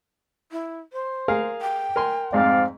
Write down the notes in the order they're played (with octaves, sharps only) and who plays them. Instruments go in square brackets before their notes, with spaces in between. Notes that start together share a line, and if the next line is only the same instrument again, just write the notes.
[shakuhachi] E4
C5
[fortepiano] G#4 A#4 F5
[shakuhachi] G5
[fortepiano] A#4 G#5 C6
[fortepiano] F2 G#2 [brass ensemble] C4 D5 F5